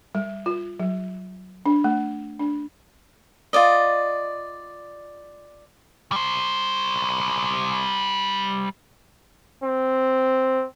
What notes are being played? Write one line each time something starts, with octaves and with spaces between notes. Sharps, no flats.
G3
F4
F#3
D4
A3
D4
F4 F#4 D5 D#5
G3 C5
C4